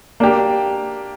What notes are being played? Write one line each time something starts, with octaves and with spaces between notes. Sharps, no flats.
A#3 D4 G4